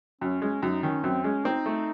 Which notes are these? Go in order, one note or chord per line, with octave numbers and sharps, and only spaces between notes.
F#2 C#4
G#3 C#4
F#2 D#4
D#3 C#4
F#2 C4
G#3 C#4
C4 D#4
A3